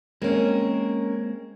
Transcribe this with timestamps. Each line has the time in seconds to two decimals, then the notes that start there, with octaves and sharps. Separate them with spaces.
0.22 G#3 A#3 C4 C#4 A#4